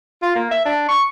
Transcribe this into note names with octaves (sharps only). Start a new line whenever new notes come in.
F4
A#3
E5
D4
C#6